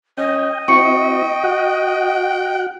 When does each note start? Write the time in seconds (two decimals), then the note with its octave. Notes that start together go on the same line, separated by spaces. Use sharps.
0.18 C#4 D#5 G5
0.68 C4 E4 F#4 G5 C#6 C#7
1.43 F#4 F#5